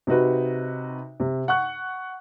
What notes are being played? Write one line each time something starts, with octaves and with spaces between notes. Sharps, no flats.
C3 D#4 F#4 B4
C3
F#5 C#6 F#6